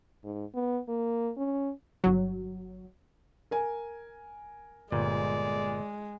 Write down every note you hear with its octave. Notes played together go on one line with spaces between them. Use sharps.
G#2
B3
A#3
C#4
G1 F#3
A#4 G#5
G1 A#2 G#3 D5